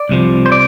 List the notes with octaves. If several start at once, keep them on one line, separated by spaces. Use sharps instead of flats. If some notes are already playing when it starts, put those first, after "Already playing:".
Already playing: D5
C2 C3 F3
C5
D5